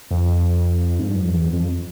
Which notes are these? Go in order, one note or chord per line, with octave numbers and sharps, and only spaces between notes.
F2
G#2
G2
F#2
F2
E2
F2